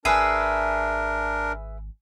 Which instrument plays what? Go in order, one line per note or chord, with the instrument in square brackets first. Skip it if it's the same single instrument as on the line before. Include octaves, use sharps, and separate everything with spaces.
[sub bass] G#1 [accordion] D4 A#4 [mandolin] G#4 B4 E5 [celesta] G#5 D#7